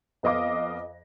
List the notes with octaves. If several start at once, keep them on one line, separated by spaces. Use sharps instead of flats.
F2 B3 D#5 F5 D6 A#6